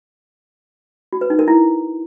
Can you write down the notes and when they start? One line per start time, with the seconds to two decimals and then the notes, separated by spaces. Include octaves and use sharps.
1.13 F#4
1.21 B4
1.30 D#4
1.39 A#4
1.48 E4